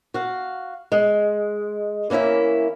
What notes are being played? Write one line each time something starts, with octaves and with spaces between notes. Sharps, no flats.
F#4 F5
G#3
E3 A#3 C#4 E4 E5